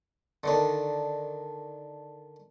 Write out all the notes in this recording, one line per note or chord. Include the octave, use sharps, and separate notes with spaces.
D3 D#3 D4